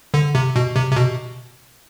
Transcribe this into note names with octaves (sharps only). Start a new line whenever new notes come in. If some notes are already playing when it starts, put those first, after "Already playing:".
D3
C3
B2
C3
C3
B2